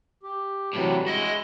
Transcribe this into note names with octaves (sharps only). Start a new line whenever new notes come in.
G4
A2 C3 E3 F#3 G3
G#3 E4 F#4 D#5